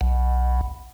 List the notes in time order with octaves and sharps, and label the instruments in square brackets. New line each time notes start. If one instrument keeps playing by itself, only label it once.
[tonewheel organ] B1